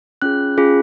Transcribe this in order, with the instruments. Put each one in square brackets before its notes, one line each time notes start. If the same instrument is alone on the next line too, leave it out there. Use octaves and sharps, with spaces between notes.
[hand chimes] C#4 F4 G#4 F#6
C#4 F4 G#4